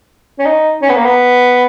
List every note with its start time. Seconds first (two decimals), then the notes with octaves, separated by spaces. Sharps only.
0.39 C#4
0.46 D#4
0.82 C#4
0.89 B3
0.97 A#3
1.05 B3